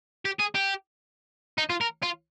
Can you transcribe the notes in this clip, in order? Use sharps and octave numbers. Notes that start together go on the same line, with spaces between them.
G4
G#4
G4
D#4
F4
A#4
F4